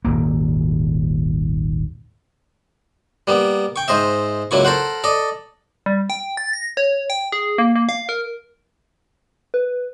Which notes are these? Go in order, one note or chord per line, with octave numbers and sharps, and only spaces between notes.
D#1 G#1 A#3
G3 A#3 B3
G5 C#6
G#2 C5 D#5 E5
C#2 F#3 A#3 E4 C#6
A4 A#4 C5 F#5
A4 D5 D#5
G3
G5
A6
A#6
C#5
G5
G#4
A#3
A#3
F5
A#4
B4